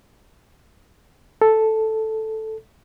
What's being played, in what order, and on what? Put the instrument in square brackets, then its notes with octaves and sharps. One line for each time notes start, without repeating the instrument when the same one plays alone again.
[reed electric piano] A4